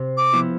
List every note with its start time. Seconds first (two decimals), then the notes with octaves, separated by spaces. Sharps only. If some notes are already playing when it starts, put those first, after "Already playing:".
Already playing: C3
0.17 D6
0.33 F3 B3 E4